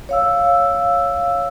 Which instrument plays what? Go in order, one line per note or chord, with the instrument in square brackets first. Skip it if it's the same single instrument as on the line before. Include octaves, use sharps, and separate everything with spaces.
[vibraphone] C#5 F5 E6